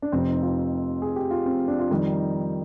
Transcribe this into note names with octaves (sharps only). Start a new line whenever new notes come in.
D4
F1 F2 C3 F3 C4
D#4
F4
G#4
G4
F4
C4
D4
F4
F2 D#3 G3 D#4
D#4